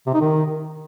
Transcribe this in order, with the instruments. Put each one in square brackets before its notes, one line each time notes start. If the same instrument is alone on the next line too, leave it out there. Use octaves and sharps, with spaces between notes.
[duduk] C3
D#4
D#3